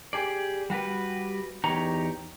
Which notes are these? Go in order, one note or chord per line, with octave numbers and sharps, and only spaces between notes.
G4 G#4 D5
G3 F#4 G4 B4
E2 D#4 G4 C#5 A#5